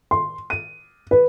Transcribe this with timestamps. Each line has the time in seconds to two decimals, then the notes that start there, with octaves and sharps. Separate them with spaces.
0.11 C6
0.50 D#7
1.11 B4